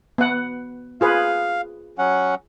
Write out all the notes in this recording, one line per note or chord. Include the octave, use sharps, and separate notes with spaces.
B3 F#5
F4 G#4 B4 F5
F#3 C#4 F#5